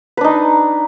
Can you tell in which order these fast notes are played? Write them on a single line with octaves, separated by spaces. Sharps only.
B4 D4 D#4